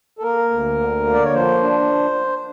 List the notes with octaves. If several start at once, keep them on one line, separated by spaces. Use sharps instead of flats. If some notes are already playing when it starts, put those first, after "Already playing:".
A4
A#3 A#4
D2
D3
A#3
D5
C#5
F3 C5
D4